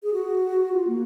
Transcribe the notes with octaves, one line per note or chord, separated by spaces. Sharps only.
G#4
F#4
F4
A#3